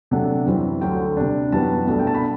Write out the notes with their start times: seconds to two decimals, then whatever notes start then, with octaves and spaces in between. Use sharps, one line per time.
0.11 C3 F#3 A3 D4 F#5
0.46 F#2 E3 G3 C4
0.81 D2 D3 F#3 G5
1.17 C3 G3 D4
1.52 F#2 E3 G3 B3 A5
1.87 C2 B2 A3 D4
1.99 G5
2.07 A5
2.15 B5